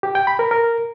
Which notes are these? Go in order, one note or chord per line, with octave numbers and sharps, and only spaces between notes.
G4
G5
B5
A#4
A#4